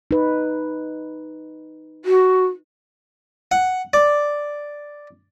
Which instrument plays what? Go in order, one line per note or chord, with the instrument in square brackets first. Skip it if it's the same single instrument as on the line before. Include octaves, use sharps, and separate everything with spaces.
[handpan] D#4 B4
[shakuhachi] F#4
[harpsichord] F#5
D5